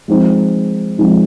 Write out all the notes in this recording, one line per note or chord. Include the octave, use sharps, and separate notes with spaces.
F3 G#3 C4 D#4
F3 G#3 C4 D#4